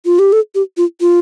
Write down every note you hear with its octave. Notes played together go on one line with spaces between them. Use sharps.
F4
G4
A4
G4
F4
F4